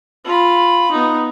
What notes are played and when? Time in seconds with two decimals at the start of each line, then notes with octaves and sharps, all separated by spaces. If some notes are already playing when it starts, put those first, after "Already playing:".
0.25 F4 B5
0.91 B3 D#4